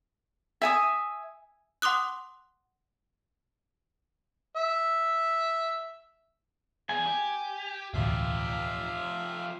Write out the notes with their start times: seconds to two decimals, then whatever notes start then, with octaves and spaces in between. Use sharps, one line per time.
0.62 E5 G#5 D#6
1.82 F#5 C6 D6 D#6 F#6
4.57 E5
6.89 E2 G#4 G#5
7.06 G4
7.94 E1 A1 D2 F3 G4 E5 F5